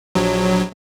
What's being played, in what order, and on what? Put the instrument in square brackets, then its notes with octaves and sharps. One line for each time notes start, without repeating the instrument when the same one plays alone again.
[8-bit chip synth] A#1 F#3